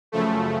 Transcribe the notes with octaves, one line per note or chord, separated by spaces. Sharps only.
F#2 C#3 F3 A3